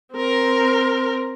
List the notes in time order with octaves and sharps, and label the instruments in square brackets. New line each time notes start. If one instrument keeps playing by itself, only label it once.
[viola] C4 A#4